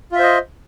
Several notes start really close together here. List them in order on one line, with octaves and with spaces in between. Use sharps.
F4 E5 C5 D#5